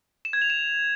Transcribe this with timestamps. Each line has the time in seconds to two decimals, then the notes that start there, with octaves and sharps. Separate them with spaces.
0.25 E7
0.33 G#6
0.42 F7
0.50 E7